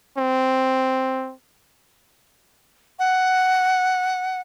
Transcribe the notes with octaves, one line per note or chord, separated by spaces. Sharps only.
C4
F#5